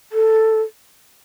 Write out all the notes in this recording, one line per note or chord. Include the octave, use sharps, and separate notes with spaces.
A4